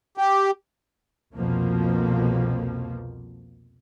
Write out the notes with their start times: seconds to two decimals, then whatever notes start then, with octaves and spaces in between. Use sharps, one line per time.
0.17 G4
1.35 C2 F2 B2 F3 A#3